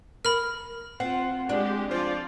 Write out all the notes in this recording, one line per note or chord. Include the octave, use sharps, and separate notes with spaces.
A#4 B5 F6
C4 F4 F#5
G#3 D4 G4
F3 F4 C5 D5